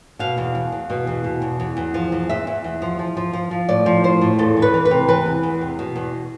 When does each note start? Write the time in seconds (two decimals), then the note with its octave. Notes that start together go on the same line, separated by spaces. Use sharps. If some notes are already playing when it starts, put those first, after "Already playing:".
0.19 B2 F5
0.37 E2
0.55 E2
0.72 E2
0.90 B2
1.07 E2
1.24 B2
1.42 E2
1.60 E2
1.77 E2
1.94 F3
2.12 E2
2.29 E2 E5
2.47 E2
2.64 E2
2.82 F3
2.99 F3
3.17 F3
3.33 F3
3.51 F3
3.69 A2 D5
3.86 F3
4.04 A2 C5
4.21 A2
4.38 E2 A4
4.57 E3
4.62 B4
4.74 E3
4.85 B4
4.91 C3
5.08 E3 B4
5.26 E2
5.43 E2
5.61 C3
5.79 B2
5.96 E2